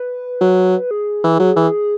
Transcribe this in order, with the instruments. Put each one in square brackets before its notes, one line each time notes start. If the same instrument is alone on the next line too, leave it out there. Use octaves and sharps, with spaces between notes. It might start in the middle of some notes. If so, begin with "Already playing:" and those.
Already playing: [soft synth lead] B4
[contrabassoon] F#3
[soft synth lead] G#4
[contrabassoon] E3
F#3
E3